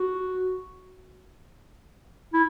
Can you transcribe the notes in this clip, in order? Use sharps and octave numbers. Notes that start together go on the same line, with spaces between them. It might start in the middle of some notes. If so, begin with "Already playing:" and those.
Already playing: F#4
E4